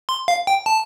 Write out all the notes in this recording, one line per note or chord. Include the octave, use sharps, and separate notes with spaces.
C6
F5
G5
A5